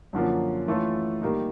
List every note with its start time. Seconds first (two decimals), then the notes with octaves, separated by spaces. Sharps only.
0.13 F#2 D3 F3 A#3 C#4
0.68 E3 A3 C#4 F4 A4
1.22 D#3 G3 A#3 D#4